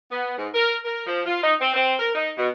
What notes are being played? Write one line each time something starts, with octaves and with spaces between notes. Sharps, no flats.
B3
G#2
A#4
A#4
F3
F4
D#4
C4
C4
A#4
D#4
B2